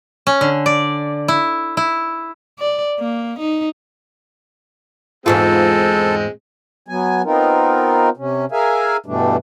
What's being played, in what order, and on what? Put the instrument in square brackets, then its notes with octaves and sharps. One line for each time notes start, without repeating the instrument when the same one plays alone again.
[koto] C#4
D3
D5
E4
E4
[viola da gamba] D5
A#3
D#4
[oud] E2 G#2 F4 [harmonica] G#3 C4 [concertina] A4
[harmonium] F#3 B3 G#5
B3 C4 D#4 F4 A#4
C3 C#4
G#4 A#4 E5 F5 G#5
G2 B2 E3 G3 A3 D4